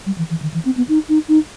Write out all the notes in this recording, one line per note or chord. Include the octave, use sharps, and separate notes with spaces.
G3
E3
E3
D#3
E3
C4
B3
D#4
D#4
D#4